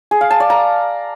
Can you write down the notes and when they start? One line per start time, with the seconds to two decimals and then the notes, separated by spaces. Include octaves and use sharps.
0.11 G#4
0.21 F5
0.31 A5
0.40 D5
0.50 A#5